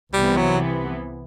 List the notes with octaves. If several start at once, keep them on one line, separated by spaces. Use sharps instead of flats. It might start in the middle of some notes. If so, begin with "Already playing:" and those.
C2 C3 E3 G3 B3
F#3